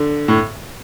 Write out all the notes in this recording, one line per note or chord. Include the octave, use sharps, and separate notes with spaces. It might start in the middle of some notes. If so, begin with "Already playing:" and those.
Already playing: D3
A2